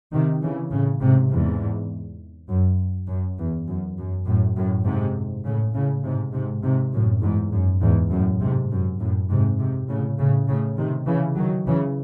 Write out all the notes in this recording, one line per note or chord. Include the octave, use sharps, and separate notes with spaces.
C3 D#3
C#3 E3
A2 C#3
G#2 C3
E2 G#2
F#2
F#2
E2
F#2
F#2
F#2 A2
F#2 A2
G#2 C3
A2 C#3
A2 C#3
G#2 C3
G#2 C3
G#2 C3
F#2 A2
E2 G#2
F#2
E2 G#2
F#2 A2
G#2 C3
F#2
F#2 A2
G#2 C3
G#2 C3
A2 C#3
A2 C#3
A2 C#3
C3 D#3
C#3 E3
D#3 F#3
C#3 E3